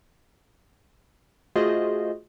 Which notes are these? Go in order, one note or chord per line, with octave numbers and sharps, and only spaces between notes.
A3 F4 F#4 G#4 C5 D#5